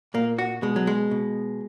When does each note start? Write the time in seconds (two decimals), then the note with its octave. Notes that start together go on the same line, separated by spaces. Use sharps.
0.14 A#2 A#3
0.38 F#4
0.62 B2 G#3
0.76 F#3
0.87 G#3
1.11 B2